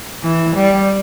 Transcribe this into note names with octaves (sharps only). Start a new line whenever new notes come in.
E3
G3